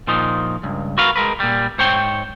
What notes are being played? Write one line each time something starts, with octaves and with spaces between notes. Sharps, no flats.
A#2 F3 D#4
C#2 G2
F#4 A#4 B4 F5
G#3 A#4 B4
A#2 G3
G#2 C5 C#5 G5